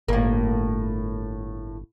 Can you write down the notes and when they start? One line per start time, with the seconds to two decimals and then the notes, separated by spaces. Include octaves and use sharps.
0.08 G1 A2 A#3